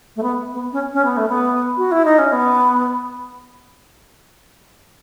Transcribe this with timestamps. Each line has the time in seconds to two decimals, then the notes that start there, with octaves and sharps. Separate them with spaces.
0.16 A3
0.23 B3
0.53 B3
0.73 C#4
0.93 C#4
1.05 B3
1.17 A3
1.29 B3
1.77 F#4
1.92 E4
2.05 D#4
2.18 C#4
2.32 B3